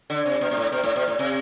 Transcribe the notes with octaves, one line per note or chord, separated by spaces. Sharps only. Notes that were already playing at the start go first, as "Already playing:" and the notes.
D3
C3
B2
B2
A2
B2
A2
B2
A2
C3